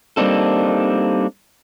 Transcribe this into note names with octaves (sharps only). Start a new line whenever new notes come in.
G3 A#3 C4 D4 D#4 A4